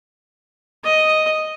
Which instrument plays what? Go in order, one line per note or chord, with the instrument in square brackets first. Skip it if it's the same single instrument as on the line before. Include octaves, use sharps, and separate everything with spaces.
[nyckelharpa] D#5